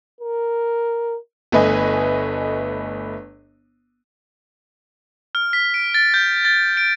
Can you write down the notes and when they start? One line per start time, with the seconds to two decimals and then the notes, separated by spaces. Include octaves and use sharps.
0.21 A#4
1.52 G1 A3 B4 D#5 G#5
5.35 F6
5.53 B6
5.74 D7
5.94 A6
6.14 G6
6.45 A6
6.77 D7